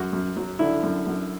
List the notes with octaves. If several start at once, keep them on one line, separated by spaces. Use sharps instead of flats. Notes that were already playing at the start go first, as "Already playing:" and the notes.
Already playing: F#2 F#4
F#2
F#3
D3 E4
F#2
F#2